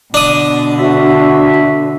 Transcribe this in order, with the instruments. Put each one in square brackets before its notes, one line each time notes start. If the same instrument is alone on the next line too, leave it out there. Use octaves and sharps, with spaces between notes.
[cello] B2 D3 [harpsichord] D4 D#6
[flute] F#4 [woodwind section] A4 C5 E5